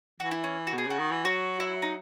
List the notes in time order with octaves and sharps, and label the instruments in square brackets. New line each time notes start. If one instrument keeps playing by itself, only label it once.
[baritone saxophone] E3 [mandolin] F#4
[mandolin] E4
C#4
F#4
[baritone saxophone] B2 [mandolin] G#4
[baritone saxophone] C#3 [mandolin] F#4
[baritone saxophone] D#3
E3
[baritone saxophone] F#3 [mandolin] F#4
[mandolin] E4
D#4